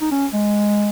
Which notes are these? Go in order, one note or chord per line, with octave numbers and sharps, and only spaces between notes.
D#4
C#4
G#3